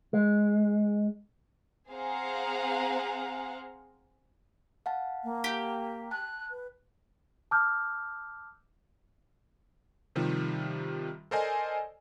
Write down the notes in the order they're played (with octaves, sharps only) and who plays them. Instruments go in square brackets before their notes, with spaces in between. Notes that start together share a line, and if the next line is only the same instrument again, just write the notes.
[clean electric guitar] G#3
[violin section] C4 G#4 C5 F5 F#5 A#5
[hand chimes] F5 F#5 A5
[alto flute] A#3
[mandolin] G4
[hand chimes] A5 [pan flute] F#6
[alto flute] B4
[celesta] A5 D6 E6 F6 G6
[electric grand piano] C3 D#3 F3 G3
A4 A#4 C5 D5 D#5 G#5